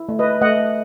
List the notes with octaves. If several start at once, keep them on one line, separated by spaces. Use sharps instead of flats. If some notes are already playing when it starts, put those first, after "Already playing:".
Already playing: E4
A3
B4 D#5
A3 D#5 F#5